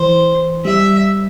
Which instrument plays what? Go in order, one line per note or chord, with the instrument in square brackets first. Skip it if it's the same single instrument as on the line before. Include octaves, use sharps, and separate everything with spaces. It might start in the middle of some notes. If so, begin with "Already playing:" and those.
Already playing: [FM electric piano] E3 [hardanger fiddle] C5
[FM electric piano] G3 [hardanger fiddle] E5